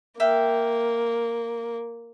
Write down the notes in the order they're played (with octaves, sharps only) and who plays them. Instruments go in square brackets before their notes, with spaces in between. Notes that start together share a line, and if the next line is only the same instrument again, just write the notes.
[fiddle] A#3 [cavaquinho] E5 F5 G5